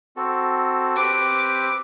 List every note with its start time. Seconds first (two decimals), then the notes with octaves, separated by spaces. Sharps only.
0.16 C4 F#4 A4
0.97 C4 G4 B4 D6